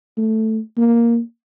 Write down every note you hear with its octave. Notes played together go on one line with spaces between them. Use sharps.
A3
A#3